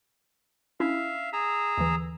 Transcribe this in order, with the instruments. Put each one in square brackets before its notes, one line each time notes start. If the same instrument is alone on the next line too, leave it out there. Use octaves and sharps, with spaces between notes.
[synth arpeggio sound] C#4 D4 E4 [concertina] E5 F5
[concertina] G#4 A#5 E6
[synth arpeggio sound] D#2 D3 E3